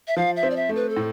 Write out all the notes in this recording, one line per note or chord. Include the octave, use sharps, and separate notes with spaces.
E5
F3 F5
E5
C4
D5
E5
A3
B4
A4
A2